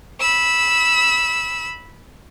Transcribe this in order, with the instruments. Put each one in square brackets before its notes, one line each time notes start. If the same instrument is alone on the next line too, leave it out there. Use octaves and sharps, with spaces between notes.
[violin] B5 E6